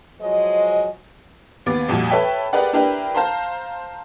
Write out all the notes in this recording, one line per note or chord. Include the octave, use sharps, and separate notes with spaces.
F3 F#3 G#3 C5 D#5
D#2 B3 D6 A6
C2 F2 A#2 F#4
A4 B4 C#5 E5 G5
G4 G#4 A#4 B4 D5 F#5
D4 E4 G4 A#4 B4
C5 F5 A5 A#5 C6